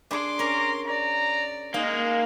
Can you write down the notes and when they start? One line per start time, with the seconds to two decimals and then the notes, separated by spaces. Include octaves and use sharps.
0.11 D4 G#4 C6 D6
0.39 C#4 A#4 A#5
0.88 D5 A#5
1.74 G#3 A#3 D#4